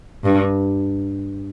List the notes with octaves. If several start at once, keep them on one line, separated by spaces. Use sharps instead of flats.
G2